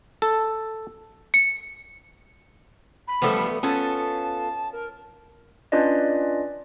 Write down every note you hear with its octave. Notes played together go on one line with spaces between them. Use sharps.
A4
C#7
B5
F3 G3 A3 B3 A4
B3 C#4 F4 A4 A5
A#4
C#4 D4 F4 B4 D5 D#5